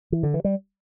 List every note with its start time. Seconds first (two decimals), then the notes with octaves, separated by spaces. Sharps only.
0.12 E3
0.23 D3
0.34 E3
0.44 G3